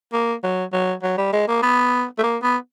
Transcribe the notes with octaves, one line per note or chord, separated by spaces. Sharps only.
A#3
F#3
F#3
F#3
G3
G#3
A#3
B3
A3
A#3
B3